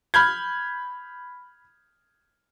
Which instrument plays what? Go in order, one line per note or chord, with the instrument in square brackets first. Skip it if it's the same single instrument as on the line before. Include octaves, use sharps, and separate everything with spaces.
[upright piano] B5 F6 G6 G#6